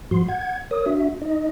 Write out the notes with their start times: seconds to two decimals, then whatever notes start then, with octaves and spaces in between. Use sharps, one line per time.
0.11 G#2 F3 F#4 C6
0.28 F#5 G#6
0.71 A#4 C#5 D#6
0.86 D4 F#4 E5
1.22 D#4 D#5